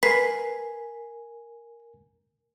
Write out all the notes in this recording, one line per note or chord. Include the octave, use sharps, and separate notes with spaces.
A#4 B4 G#5 B6 C7